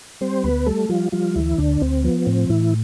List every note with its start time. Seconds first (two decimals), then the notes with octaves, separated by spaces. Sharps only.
0.21 G3 C4 C5
0.43 D2 B3 B4
0.66 G3 A3 A4
0.89 F3 G3 F4
1.12 F3 G3 F4
1.35 D2 E3 E4
1.58 D2 D3 D4
1.81 D2 C4
2.04 F3 B3
2.26 A2 C4
2.49 A2 E3 E4